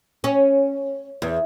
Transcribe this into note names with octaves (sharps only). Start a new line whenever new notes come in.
C#4
E2